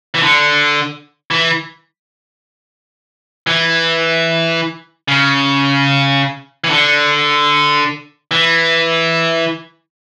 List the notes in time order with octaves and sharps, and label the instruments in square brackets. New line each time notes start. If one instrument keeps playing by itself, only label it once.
[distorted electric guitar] E3
D3
E3
E3
C#3
E3
D3
E3